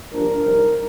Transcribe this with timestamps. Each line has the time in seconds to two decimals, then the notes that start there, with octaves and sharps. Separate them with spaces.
0.11 G2 F3 A#3 D4 A#4
0.42 C3 G3 C4 D#4